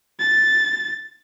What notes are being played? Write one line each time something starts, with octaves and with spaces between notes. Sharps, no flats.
A6